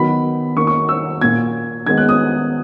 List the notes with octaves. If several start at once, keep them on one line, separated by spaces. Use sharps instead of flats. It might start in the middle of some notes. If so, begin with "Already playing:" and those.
Already playing: D#3 F#3 B3 B5
D#3 A#3 C#6
C#6
E6
A#2 A#3 G#6
D#3 G#3 B3 G#6
F#6
D#6